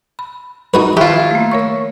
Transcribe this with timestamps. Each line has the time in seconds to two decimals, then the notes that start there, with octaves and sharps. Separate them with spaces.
0.19 B5
0.74 D#4 F#4 B4
0.97 D#3 E4 F4 G4 C#6
1.31 A3 A#3
1.51 A#4 C#5 C#6